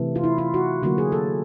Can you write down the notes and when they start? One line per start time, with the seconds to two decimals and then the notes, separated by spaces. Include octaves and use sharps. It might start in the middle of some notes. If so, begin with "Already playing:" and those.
Already playing: C3 E3 A3
0.16 F4
0.24 E4
0.38 F4
0.54 F#4
0.83 D3 F#3 A#3 F#4
0.98 G#4
1.12 A4